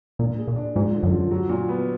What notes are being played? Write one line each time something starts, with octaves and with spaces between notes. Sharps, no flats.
A#2 D4
G#4
A#2
D4
G#2 F3
D3
F#2
F3
F#3
A#2
B3